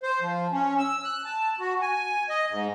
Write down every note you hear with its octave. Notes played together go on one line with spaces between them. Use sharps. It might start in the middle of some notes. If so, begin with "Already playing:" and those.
C5
F3
C#4
E6
F#6
A5
F#4
G#5
D#5
G#2